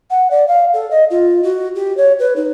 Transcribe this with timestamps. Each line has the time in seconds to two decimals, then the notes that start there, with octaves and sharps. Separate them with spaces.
0.10 F#5
0.30 D5
0.47 F5
0.73 A4
0.90 D#5
1.10 F4
1.43 F#4
1.75 G4
1.97 C#5
2.19 B4
2.36 D#4